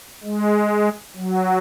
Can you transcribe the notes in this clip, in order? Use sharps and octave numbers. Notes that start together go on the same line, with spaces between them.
G#3
F#3